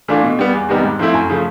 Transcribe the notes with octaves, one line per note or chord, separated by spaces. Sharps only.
E3 A3 D4 F4
B2
G3 B3
E2
C3 D#3 G3 B3
G#2
F3 A3 C4 E4
F#2
C#3 F3 A3